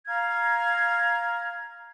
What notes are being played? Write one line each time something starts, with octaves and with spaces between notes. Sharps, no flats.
F5 A#5 F6 G#6